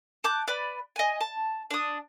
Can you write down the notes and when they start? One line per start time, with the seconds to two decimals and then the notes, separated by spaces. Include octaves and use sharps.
0.24 A5 D6 F#6 G6
0.48 B4 D5 B5
0.96 D#5 G#5
1.21 A5
1.71 D4 D#6